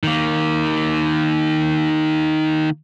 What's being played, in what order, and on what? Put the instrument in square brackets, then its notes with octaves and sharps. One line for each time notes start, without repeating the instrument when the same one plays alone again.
[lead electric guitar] D#3 A#3